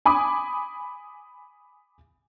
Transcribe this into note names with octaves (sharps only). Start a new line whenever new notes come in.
G#5 B5 D6 D#6